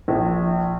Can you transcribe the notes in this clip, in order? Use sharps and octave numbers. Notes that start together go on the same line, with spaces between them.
A#1